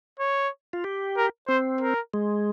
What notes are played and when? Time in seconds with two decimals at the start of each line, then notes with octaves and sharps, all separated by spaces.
0.20 C#5
0.73 F4
0.84 G4
1.17 A#4
1.48 C4 C5
1.81 A#4
2.14 G#3